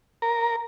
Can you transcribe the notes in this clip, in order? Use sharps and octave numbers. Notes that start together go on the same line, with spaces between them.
A#4